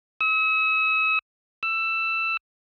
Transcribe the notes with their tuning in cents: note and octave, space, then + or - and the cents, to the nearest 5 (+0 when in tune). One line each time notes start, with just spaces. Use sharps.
E6 -45
E6 +15